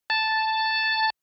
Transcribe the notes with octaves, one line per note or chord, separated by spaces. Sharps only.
A5